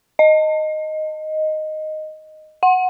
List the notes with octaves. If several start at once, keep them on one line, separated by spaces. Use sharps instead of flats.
D#5
F#5